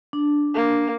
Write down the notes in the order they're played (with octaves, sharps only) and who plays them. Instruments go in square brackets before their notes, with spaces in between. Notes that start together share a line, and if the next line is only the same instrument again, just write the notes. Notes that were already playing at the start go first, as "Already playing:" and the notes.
[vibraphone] D4
[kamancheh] A#3